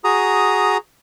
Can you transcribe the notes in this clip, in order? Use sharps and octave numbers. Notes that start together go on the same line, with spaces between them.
F#4 G#4 A#5 D#6